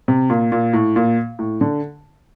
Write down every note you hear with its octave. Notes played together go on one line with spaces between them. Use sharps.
C3
A#2
A#2
A2
A#2
A2
D3